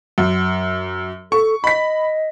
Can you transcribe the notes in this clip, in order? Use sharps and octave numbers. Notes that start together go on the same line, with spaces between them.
F#2
A4 C#6
D#5 B5 B6